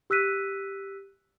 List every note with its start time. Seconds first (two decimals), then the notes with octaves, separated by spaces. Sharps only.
0.10 G4 E6 F#6 B6 D#7